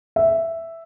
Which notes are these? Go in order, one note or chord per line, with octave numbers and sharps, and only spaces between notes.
E5